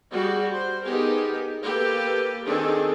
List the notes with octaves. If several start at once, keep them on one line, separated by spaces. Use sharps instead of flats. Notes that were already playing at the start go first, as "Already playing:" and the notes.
G3 F#4 G#4
C5
B3 D#4 G4 G#4 A#4
A#3 G4 A4 B4
D#3 C4 D4 G#4 A4